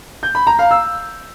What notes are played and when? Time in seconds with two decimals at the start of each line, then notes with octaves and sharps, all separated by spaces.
0.23 G6
0.35 B5
0.47 A#5
0.59 F5
0.71 E6